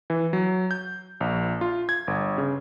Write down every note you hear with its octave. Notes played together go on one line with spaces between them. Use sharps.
E3
F#3
G6
A#1
F4
G#6
G1
C#3